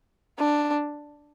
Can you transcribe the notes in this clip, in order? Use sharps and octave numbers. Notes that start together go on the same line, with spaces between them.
D4